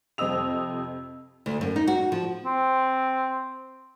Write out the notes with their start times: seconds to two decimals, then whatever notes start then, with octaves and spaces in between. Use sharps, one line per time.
0.18 F2 C3 C5 D#5 E6 F7
1.46 D2
1.61 F#2
1.76 D#4
1.88 F#4
2.12 F3
2.45 C4